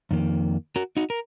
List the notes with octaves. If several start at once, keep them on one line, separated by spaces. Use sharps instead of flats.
F2 D#3 A#3
F#4 A#4
D#4 F#4
A#4